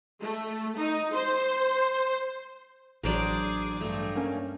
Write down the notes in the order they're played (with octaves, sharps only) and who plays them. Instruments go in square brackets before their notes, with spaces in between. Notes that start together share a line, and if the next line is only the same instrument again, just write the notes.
[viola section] A3
D#4
C5
[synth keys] A1 F#3 [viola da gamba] D4 G#4 [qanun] A#4 C5 D5
[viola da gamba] G2 [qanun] A3
[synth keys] A#3 C#4